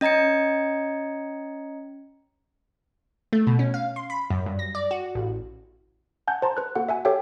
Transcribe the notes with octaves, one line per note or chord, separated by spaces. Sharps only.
C#4 D#5 A#5 G#6 C#7
A3
B2
C#4
F5
C6
B5
F#2
G2
A#6
D5
F#4
A1
F#5 G#5 A5 G6
C5 A5 A#5 C6
B4 F#6
A#3 F#4 A4 F#5
E5 F#5 G#5
G4 A4 C#5 E5 G5